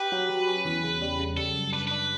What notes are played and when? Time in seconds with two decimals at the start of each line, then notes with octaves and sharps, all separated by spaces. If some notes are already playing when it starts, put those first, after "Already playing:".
Already playing: G4 B4
0.12 F#3
0.30 F#3
0.47 C#4
0.65 E2
0.84 C#3
1.02 G3
1.19 C#3
1.37 G3 A4
1.55 F#2
1.72 D4 B4
1.87 D4 B4